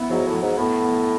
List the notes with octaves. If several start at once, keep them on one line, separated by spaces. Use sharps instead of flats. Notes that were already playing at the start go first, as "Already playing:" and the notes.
Already playing: B3 E4
G#2 F#3
A2
F#3
G#2
A2 B3
B3